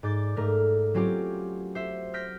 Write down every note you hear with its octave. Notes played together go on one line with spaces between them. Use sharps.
G#2 D5 G6 A6
G#2 A3 A#4 F6
F#3 C4 C#4 F4 G4
C5 E5
F6 G6 A#6 B6 D7